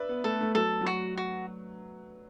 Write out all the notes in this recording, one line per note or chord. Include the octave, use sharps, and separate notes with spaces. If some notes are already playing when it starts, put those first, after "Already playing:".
Already playing: B4 D5 E5
B3
A3 A4
A3
F#3 A4
F#3
F#4
F#4